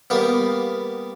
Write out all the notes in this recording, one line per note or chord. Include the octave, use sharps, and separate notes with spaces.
G3 A#3 B3